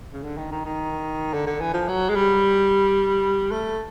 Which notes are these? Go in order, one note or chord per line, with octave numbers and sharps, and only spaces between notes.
C#3
D3
D#3
D#3
D#3
D3
D3
E3
F3
F#3
G#3
G3
A3